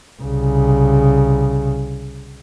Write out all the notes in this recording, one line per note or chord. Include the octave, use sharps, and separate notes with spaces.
C2 C#3